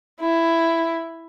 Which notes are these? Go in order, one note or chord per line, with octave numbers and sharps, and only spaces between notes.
E4